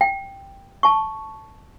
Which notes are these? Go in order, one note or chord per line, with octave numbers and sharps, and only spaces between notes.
G5
A5 C#6